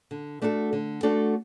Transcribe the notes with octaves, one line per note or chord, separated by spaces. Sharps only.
D3
A3 D4 F#4 A4
D3
A3 D4 F#4 A4